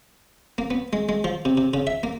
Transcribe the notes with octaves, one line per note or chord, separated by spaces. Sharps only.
A#3
B3
G#3
G#3
F3
C3
C3
C#3
E5
A#3